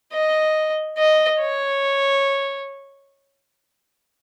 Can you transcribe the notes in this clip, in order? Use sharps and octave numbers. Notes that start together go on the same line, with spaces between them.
D#5
D#5
C#5